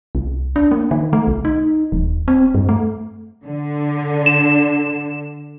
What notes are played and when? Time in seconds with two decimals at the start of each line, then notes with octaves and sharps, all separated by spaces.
0.15 C2
0.56 D4
0.71 A#3
0.91 D#3
1.13 A3
1.27 C2
1.45 D#4
1.92 D#1
2.28 C4
2.54 G2
2.69 A3
3.45 D3
4.26 E7